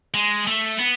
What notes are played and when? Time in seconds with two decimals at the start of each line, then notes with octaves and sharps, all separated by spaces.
0.14 G#3
0.47 A3
0.79 B3